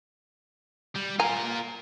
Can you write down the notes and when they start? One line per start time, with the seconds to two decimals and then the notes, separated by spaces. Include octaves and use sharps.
0.96 G3
1.20 F4 A#4 G#5 A#5